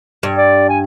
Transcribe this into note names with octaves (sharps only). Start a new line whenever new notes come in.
G2
D5
G#5